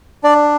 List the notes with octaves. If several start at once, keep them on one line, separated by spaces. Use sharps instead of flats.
D4 D5